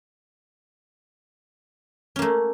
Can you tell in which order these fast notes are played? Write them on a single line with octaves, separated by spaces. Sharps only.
C#4 A#3 A3